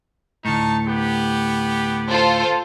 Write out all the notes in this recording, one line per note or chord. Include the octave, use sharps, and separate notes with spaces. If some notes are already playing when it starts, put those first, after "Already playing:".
D2 A2 D#4 A5 C#6
B3 G4
F4 A4 C5